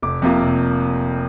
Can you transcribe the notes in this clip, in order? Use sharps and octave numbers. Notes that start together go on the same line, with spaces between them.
F1 D6
F2 C3 A#3 F4
F1